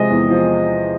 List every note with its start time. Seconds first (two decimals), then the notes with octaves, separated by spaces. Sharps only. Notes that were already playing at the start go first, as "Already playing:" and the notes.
Already playing: C3 F3 G#3 D#5
0.10 E2
0.30 F3